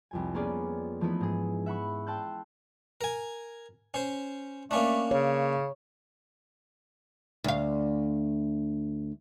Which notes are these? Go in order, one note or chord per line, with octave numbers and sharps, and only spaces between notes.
C2 F2 G#5
A#3 B3 C#4 F4 G#4 D5
E3 F3 A3 B3 D#4 E4
G#2 G#4
E5 F#5 B5 C#6
G5 A5 C6 E6 F#6 G6
A#4 G#5
C#4 C5
A3 A#3 C#4 D4
C#3 C#5
D2 F5